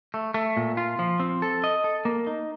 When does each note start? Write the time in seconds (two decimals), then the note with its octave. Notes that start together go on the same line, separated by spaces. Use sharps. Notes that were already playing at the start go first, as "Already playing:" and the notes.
0.14 A3
0.34 A3
0.57 A#2
0.77 F4
0.99 F3
1.20 C4
1.42 A4
1.64 D#5
1.84 A4
2.05 A#3
2.27 D#4